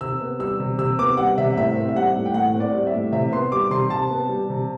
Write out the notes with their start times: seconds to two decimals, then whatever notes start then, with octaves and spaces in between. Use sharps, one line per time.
0.01 C3 E6
0.21 B3
0.39 G3 E6
0.60 C3
0.78 C3 E6
0.99 B3 D6
1.17 G3 F#5
1.38 C3 E5
1.56 A2 E5
1.76 C4
1.88 E5
1.95 G3 F#5
2.15 A2
2.25 G5
2.34 A2 F#5
2.55 C4
2.60 D5
2.74 G3
2.87 E5
2.94 A2
3.12 C3 E5
3.32 B3 C6
3.52 G3 D6
3.71 C3 C6
3.90 C3 A5
4.10 B3
4.29 G3
4.50 C3